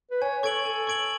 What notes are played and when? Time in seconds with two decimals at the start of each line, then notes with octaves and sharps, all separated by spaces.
0.11 B4
0.22 C#5 G#5
0.43 A4 C#6 G#6 D7 F#7
0.65 A4 G#5
0.87 C#6 G#6 D7 F#7